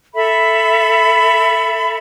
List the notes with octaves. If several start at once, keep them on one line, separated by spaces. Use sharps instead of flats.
A4 E5 B5